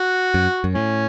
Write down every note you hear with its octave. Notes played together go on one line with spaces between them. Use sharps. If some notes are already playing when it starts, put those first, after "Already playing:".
Already playing: F#4
F#2
F#2
A2 C#4